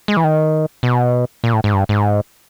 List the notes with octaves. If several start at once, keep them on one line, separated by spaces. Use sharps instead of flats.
G#3
E3
D#3
B2
A#2
A2
G#2
G2
G#2